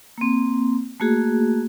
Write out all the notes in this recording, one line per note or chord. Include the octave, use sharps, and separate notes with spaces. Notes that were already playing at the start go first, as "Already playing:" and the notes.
A#3 C4
A3 A#3 F#4 G#4